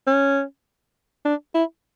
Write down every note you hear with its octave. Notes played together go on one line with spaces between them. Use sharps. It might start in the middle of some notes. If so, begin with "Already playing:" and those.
C#4
D4
E4